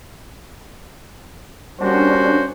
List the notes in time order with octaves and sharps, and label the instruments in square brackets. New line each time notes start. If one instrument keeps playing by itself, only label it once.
[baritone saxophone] G3 [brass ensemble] A#3 C#4 F#4 [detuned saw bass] D4 [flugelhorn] C5